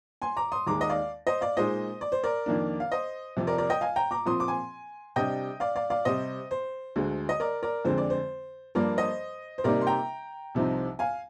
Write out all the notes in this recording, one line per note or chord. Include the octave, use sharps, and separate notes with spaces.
G#5 C6
A#5 D6
C6 D#6
D#2 D#3 G#3 A#5 D6
D#5
D5 F5
C5 D#5
D5 F5
A#2 G#3 D#4 C5 D#5
D5
C5
A#4 D5
F2 D#3 A#3 D4
F5
C5 D#5
F2 C3 F3
A#4 D5
A#4 D5
D#5 G5
F5 G#5
G5 A#5
A#5 D6
A#2 F3 C4 C6 D#6
D6
G#5 C6
C3 G3 D4 D#5 G5
D5 F5
D5 F5
D5 F5
C3 G3 C4 C5 D#5
C5
D2 D3 G#3
D#5
A#4 D5
A#4 D5
F2 D3 G#3 C4 C5
D5
C5
G2 F3 A#3 A#4 D5
C5 D#5
C5
C3 G3 A#3 D#4 A#4 D5
C6
G5 A#5
C2 C3 F3 C4 D#4
F5 G#5